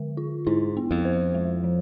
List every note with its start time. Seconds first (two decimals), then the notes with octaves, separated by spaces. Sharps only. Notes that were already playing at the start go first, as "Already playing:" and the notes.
Already playing: D3 G#3
0.17 F4
0.47 G#2 E4
0.77 B3
0.91 F2
1.05 C5
1.34 G#3
1.64 F3